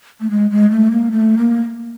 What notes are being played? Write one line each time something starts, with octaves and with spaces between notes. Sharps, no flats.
A3
G#3
G#3
A3
A#3
A3
A#3